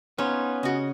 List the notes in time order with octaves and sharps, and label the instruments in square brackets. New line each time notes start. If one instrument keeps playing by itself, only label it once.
[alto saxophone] B3 [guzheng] C#4 [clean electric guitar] D#4 F4 [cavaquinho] C5
[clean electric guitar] C#3 [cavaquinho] F#4 D#5